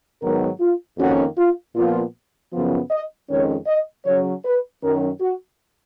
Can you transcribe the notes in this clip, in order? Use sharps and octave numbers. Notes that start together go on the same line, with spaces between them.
G#2 D#3 F#3 B3 A#4
F4
F2 D#3 A#3 C#4 F#4
F4
A#2 F3 B3 F4
F#2 C#3 F3 B3 F4
D#5
F2 D#3 G#3 C#4 C#5
D#5
C#3 F#3 C#4 C#5
B4
F#2 D#3 F#3 C#4 A#4
F#4